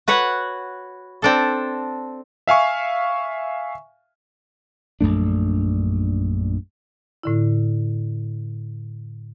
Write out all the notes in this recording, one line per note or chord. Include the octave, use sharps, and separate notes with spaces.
F#4 B4 C#5 F#5
C4 D4 A4
E5 F5 G#5 C#6
A#1 F#2 A3 D4
A2 D3 E4